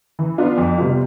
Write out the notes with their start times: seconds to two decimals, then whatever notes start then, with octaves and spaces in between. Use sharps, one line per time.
0.19 E3
0.38 B3 D4 F4
0.58 F2
0.78 C3 G3 B3 F4